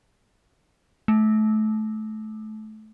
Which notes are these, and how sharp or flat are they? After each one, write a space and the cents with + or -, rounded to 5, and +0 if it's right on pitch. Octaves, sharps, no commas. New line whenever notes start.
A3 -25